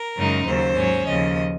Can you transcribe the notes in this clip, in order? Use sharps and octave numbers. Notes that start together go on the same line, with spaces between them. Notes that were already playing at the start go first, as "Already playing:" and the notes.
Already playing: A#4
F#2 C#3 G#3 D#4
D#2 C#3 F#3 C5
G#2 F#3 C#4
D#2 C#3 F3 D#5